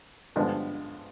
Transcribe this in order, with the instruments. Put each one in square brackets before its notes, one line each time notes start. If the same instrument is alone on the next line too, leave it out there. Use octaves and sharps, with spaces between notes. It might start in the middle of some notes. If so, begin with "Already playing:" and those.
[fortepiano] G2 D3 F3 G#3 B3